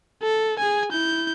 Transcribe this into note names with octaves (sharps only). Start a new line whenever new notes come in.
A4
G#4 G#5
E4 G6